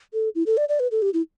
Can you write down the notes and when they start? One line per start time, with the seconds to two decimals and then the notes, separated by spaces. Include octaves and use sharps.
0.13 A4
0.35 E4
0.46 A4
0.57 D5
0.69 D5
0.80 B4
0.91 A4
1.02 G4
1.14 E4